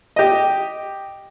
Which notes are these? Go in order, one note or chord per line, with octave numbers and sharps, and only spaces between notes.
G4 D#5